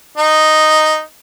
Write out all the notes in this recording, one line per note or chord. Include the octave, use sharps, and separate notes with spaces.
D#4